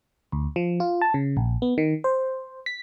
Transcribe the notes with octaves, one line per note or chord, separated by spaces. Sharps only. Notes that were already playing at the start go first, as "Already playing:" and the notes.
D2
F3
F4
A5
C#3
A#1
B3
D#3
C5
B6